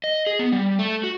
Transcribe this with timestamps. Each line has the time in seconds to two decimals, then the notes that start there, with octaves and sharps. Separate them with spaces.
0.04 D#5
0.26 G#4
0.39 B3
0.52 G3
0.79 A3
1.03 F#4